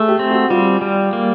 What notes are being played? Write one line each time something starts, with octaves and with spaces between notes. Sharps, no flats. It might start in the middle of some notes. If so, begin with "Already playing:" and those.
Already playing: A3 G#4
G4
C4
F#4
G3 F4
G3
A#3